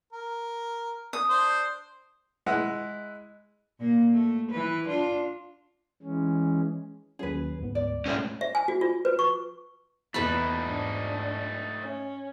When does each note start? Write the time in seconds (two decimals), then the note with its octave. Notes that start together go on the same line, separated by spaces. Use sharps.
0.13 A#4
1.13 D#6
1.29 D4 C5
2.46 G#3 E4 F#5
3.79 A#2 A#3
4.13 A3
4.51 E3 B4
4.88 D4 F4
6.03 E3 G#3 C#4
7.19 D#2 F#3 C#4 G#4 B4
7.60 D2 G#2 B3
7.75 D5
8.06 A2 G#3 A3 C#4
8.41 E5
8.55 G#5
8.68 F#4
8.81 F4
9.05 B4
9.19 C#6
10.14 E2 A3 D#4 B4 A5 B5
10.65 G#2 D4
11.80 C#4